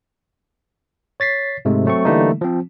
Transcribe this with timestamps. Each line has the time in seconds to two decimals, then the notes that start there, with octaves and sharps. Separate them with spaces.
1.20 C#5 A6 B6 C7
1.65 G#2 C3 G#3 A3
1.86 F#3 A3 C4 C#6
2.05 D3 E3 G3 A3 A#3 D#4
2.41 F3 C4